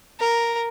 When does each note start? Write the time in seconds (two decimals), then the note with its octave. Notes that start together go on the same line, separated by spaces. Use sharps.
0.19 A#4